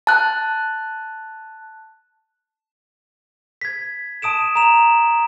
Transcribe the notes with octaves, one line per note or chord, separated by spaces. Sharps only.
A5 F#6
G#6 B6
A5 D#6 D7 E7
A#5 E7